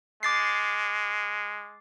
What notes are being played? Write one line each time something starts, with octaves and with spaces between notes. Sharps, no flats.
G#3 D6 A6 C7